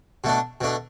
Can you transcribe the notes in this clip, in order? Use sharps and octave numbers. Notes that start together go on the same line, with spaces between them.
B2 A3 D4
B2 A3 D4